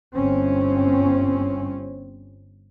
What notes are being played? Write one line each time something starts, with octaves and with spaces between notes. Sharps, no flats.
G1 C4 C#4